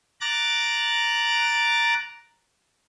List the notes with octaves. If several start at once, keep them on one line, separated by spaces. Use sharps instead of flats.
A#5 D6 F#6 A6